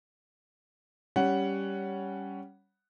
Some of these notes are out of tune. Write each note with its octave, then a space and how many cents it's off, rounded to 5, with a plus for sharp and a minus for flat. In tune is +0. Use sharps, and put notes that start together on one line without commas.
G3 +0 C#4 +10 F#5 +5